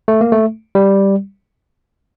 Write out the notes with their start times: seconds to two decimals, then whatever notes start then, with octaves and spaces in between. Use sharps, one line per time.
0.08 A3
0.21 A#3
0.32 A3
0.75 G3